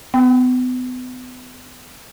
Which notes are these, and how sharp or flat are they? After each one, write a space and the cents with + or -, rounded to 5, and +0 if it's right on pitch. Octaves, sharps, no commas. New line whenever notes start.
B3 +35 G5 +0